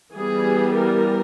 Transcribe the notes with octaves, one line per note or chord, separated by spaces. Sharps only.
E3 G3 B3 G#4
A#4